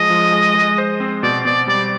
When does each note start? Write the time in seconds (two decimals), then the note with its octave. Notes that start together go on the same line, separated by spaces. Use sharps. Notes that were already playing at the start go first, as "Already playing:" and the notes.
Already playing: F3 G#3 D#5
0.10 F3
0.32 G#3
0.55 G#3
0.78 C5
1.00 C4
1.23 B2 D5
1.45 B2 D5
1.68 G3 D5